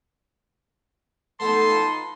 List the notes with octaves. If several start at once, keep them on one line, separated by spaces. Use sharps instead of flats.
A3 B3 D#4 A4 A5 C6
F4 B4